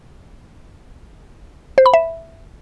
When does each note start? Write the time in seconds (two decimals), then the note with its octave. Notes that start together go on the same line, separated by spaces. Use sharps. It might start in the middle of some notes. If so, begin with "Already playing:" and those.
1.78 C5
1.86 B5
1.94 E5